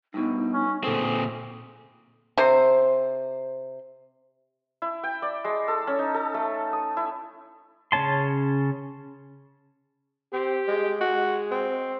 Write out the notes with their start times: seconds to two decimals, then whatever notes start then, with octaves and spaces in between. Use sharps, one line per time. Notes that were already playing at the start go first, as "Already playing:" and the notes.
0.14 G2 B2 D#4
0.53 C#4
0.84 F#2 A#2 C4 G#4 A4
2.37 C3 C5
4.82 E4
5.04 G5
5.22 D5
5.44 G#3
5.68 A4
5.87 C#4
5.99 D#4
6.14 A4
6.34 A3
6.73 D#6
6.97 E4
7.92 C#3 C#4 C#5 A5 C6
10.33 C4 G4
10.68 G#3
11.01 G#3 F#4
11.51 C4